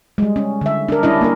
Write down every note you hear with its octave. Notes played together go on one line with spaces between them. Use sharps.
G3 G#3
C#4
D3 E5
D4 A#4
G3 C#4 D4 E4 D#5
A#3 D4 A#4